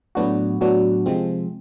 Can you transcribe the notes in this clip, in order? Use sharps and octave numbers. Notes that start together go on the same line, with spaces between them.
A2 F#3 B3 D4 F#4
A2 F#3 B3 D4 F#4
C3 F3 G#3 C4